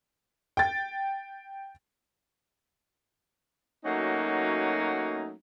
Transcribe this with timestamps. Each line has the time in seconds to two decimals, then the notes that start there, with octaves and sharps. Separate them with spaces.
0.57 G5 A6
3.85 F#3 A3 A#3 C#4 D#4 F#4